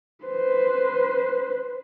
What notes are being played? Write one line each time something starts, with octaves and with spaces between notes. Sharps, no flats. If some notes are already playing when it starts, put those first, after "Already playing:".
B4 C5